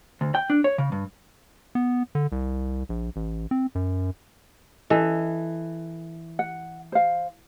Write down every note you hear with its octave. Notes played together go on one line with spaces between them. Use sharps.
D2
G5
D4
C#5
C#3
G2
B3
D3
C2
A#1
A1
C4
F#2
E3 A4 D#5
F#5
C5 F5